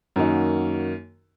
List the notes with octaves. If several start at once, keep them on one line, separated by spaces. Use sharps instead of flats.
F#2 D#3 A#3 D#4 F#4